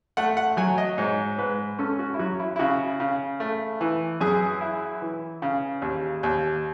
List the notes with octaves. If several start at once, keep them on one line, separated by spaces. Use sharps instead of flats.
A3 F#5
F#5
F#3 G#5
D#5
G#2 C#5
G#2 B4
C#4 A4
F#4
E4
F#3 F#4
E4
E4
C#3 F#4
C#3
A3
E3
F#2 G#4
E4
E3
C#3
D#2
D#2